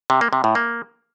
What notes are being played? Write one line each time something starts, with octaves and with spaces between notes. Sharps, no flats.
C3
A#3
C3
A2
A#3